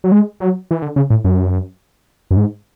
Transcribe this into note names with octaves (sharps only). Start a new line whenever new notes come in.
F#3
G#3
F#3
E3
D3
C#3
A2
F#2
F#2
G#2